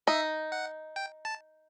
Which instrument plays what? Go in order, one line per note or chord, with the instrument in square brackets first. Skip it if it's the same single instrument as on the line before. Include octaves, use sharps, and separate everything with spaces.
[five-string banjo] D#4 [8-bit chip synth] E5
[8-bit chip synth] F#5
G5
A5